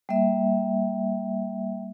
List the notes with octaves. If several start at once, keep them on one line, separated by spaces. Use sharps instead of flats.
G3 A#3 E5